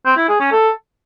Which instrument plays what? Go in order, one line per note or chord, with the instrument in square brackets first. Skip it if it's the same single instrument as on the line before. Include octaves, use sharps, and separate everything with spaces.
[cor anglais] C4
E4
G#4
C#4
A4